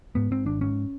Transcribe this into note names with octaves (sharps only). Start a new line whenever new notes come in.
G#2 B3
G#2 C4
G#1 D4
G#2 C#4